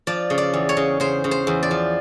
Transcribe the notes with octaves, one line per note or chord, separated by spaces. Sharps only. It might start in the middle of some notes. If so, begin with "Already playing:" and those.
F3 D5
C#3
D5
E2
C#5
C#3
C#3 C5
C#3
C5
E2
D5
F3